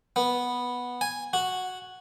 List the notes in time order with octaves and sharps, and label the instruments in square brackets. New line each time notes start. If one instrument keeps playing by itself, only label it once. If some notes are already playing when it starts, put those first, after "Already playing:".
[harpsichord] B3
G#5
F#4